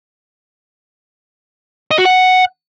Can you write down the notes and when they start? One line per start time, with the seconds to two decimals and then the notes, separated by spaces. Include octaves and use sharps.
1.91 D#5
1.98 F#4
2.05 F#5